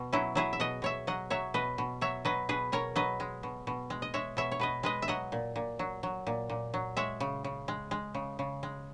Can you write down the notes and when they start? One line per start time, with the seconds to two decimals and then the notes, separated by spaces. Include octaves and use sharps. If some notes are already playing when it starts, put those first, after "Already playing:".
Already playing: B2
0.13 F#3 C#4 E4
0.35 F#3 E4 G#4
0.53 E5
0.60 B2 D#5 F#5
0.82 B2 C#5 E5
1.07 F#3 D#5 F#5
1.30 F#3 C#5 E5
1.54 B2 B4 D#5
1.78 B2
2.01 F#3 C#5 E5
2.25 F#3 B4 D#5
2.49 B2 G#4 B4
2.72 B2 A#4 C#5
2.96 F#3 B4 D#5
3.20 G#3
3.43 B2
3.67 B2
3.90 G#3
4.02 D#5
4.14 G#3 C#5 E5
4.37 B2 C#5 E5
4.52 C#5
4.60 B2 B4 D#5
4.83 G#3 B4 D#5
5.02 E5
5.08 F#3 D#5 F#5
5.32 A#2
5.56 A#2
5.79 F#3
6.03 F#3
6.27 A#2
6.50 A#2
6.74 F#3
6.97 G#3 C#5 E5
7.20 C#3
7.44 C#3
7.68 G#3
7.91 G#3
8.15 C#3
8.39 C#3
8.63 G#3